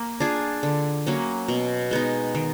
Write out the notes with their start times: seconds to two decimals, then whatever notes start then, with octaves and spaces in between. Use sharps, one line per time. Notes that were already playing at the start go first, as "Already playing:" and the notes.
Already playing: A#3
0.20 D4 F4 G#4
0.63 D3
1.06 F#3 A#3 C#4
1.48 B2
1.91 G#3 B3 D#4
2.35 D#3